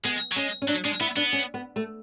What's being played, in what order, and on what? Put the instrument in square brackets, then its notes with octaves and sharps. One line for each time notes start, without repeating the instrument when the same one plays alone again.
[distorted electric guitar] G#3 [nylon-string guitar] B3
[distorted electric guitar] F#3
[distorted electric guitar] G#3 [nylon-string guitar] C#4
[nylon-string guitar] C#4
[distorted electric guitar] F#3 [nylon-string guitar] D4
[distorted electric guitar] G#3 [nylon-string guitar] D4
[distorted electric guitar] B3 [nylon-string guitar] E4
[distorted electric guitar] B3 [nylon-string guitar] D4
[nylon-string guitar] C#4
B3
A3